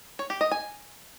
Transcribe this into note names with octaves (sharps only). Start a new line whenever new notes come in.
C#5
G4
D#5
G#5